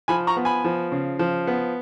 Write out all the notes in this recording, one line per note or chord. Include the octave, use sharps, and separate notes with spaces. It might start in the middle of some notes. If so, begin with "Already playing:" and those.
F3 G#5 B5
A#5 C#6
B3
G#5 B5
F3
C#3
F3
B3